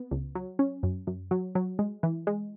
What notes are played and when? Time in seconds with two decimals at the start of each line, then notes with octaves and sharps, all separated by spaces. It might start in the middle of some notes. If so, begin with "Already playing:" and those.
Already playing: B3
0.11 C#2
0.35 F#3
0.59 C#4
0.83 F#2
1.07 F#2
1.31 F#3
1.55 F#3
1.79 G#3
2.03 E3
2.27 G#3